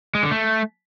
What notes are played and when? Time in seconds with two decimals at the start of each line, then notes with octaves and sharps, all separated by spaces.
0.15 G#3
0.23 D3
0.31 A3